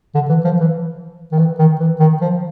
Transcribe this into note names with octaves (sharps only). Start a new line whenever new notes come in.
D3
E3
F3
E3
D#3
E3
D#3
E3
D#3
F3